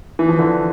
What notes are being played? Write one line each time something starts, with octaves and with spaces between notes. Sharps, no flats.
E3
F3
D3 E3